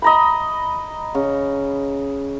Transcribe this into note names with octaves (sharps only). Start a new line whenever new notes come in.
D#5 A#5 B5
C#3